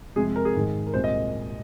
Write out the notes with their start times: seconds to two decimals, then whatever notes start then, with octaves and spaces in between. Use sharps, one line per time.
0.16 F2 C3 G#3 G#4
0.36 A#4
0.45 G#4
0.55 G#2 D#3 G#3
0.87 A#4
0.93 C2 A#2 G#3 C5
1.04 D#5